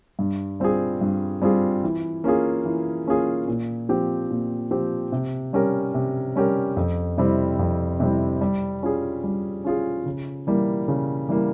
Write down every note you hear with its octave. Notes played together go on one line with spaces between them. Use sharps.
G2
G3 C4 F4 G#4
G2
G3 C4 F4 G#4
E3
A#3 C#4 F4 G#4
E3
A#3 C#4 F4 G#4
A#2
F3 C4 G4
A#2
F3 C4 G4
C3
G3 C#4 G4 A#4
C3
G3 C#4 G4 A#4
F2
C3 G3 C4 E4
F2
C3 G3 C4 E4
G3
C#4 F4 G#4
G3
C#4 F4 G#4
C#3
E3 G3 A#3
C#3
E3 G3 A#3